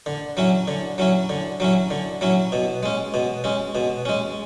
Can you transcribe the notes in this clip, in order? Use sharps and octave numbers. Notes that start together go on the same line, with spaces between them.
D3
F#3 C#4 E4
D3
F#3 C#4 E4
D3
F#3 C#4 E4
D3
F#3 C#4 E4
B2
G#3 C#4
B2
G#3 C#4
B2
G#3 C#4